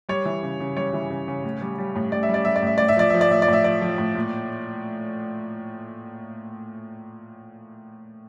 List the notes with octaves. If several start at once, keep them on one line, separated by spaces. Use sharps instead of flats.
G3 C#5
E3
C#3
C#3
G3 C#5
E3
C#3
C#3
A2
G3
G3
A2
A2 D5
E5
G3
D5
G3 E5
D5
A2 E5
A2 D5
E5
F3 D5
F3 E5
D5
A2 E5
D5
A2
E5
F3 D5
F3
A2
A#2